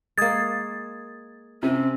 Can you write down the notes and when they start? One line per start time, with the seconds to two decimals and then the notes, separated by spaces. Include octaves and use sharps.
0.18 G#3 A#3 D#6 G#6 A6
1.63 C3 C4 C#4